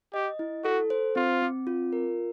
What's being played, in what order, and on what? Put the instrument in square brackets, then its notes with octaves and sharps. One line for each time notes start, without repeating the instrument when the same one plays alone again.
[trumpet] G4 [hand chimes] D#5
[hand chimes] E4
[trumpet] F#4 [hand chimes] A4
[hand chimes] C5
[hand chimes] C4 [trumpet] F4
[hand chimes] C4
F4
A#4